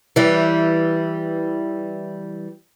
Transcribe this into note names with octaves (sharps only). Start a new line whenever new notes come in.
E3 G3